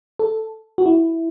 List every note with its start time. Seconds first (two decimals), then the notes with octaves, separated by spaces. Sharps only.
0.19 A4
0.78 F#4
0.86 E4